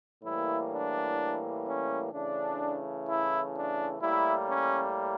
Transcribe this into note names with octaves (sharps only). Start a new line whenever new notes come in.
A2 E3 G3 A#3 E4
D4
C#4
C#3 E3 A3 D4
E4
D4
A2 G3 A#3 E4
C#4